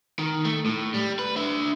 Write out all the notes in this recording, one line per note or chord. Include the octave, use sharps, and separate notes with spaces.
D#3
A3
A2
G3
B4
D4 E5